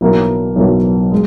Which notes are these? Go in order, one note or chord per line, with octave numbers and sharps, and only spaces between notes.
B1 B2 F#3 A#3 E4
B1 B2 F#3 A#3 E4
G#3